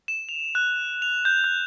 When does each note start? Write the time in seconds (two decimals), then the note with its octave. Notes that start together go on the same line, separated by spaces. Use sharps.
0.08 E7
0.29 F7
0.55 F#6
1.02 F7
1.25 G6
1.44 F#6